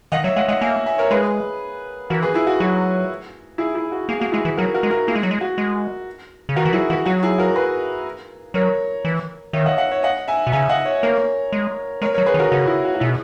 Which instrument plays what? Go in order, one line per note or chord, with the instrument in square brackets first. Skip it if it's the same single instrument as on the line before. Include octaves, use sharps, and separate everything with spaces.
[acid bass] D#3 [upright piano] D#5 F#5
[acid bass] F#3 [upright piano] C#5 E5
[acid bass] G#3 [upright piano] D#5 F#5
[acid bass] G#3 [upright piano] D#5 F#5
[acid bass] A#3 [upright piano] E5 G#5
[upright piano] E5 G#5
A#4 C#5
[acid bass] G#3 [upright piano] G#4 B4
[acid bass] E3 [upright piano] F#4 A#4
[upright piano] G#4 B4
E4 G#4
F#4
[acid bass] F#3 [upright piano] F#4
[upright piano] E4 G#4
E4 G#4
F#4
[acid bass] A#3 [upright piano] G#4
[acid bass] A#3 [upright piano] F#4
[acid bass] G#3 [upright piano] E4 G#4
[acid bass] E3
[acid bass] F#3 [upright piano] F#4 A#4
[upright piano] F#4 A#4
[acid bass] G#3
[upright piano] F#4 A#4
[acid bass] A#3 [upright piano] E4 G#4
[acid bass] G#3
F#3
G#3
[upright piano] F#4
[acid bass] G#3
C#3
[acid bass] D#3 [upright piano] F#4 A#4
[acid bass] E3
[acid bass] F#3 [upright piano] E4 G#4
[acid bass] E3 [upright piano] F#4
[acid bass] F#3 [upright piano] F#4
[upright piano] E4 G#4
F#4 A#4
G#4 B4
[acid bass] F#3 [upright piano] A#4 C#5
[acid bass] E3
[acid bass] D#3 [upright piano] C#5 E5
[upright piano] D#5 F#5
D#5 F#5
C#5 E5
D#5 F#5
E5 G#5
[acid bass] B2
[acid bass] C#3 [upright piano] E5 G#5
[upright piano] D#5 F#5
C#5 E5
[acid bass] A#3 [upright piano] A#4 C#5
[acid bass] G#3
[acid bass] G#3 [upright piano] A#4 C#5
[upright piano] A#4 C#5
[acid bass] F#3
[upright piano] G#4 B4
[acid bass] D#3
[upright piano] F#4 A#4
[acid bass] C#3 [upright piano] F#4
[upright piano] E4
F#4
F#4
[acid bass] B2 [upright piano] E4 G#4